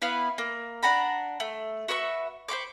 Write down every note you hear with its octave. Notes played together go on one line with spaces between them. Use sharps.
B3 E4 B4 F5
A#3
D4 F#5 A#5 B5
A3
F#4 B4 E5 C#6
C5 B5 C#6 D6